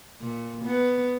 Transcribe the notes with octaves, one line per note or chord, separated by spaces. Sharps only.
A#2
B3